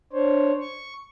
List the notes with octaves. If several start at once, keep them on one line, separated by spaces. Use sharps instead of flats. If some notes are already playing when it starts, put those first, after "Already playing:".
D4 C5 C#5
C#6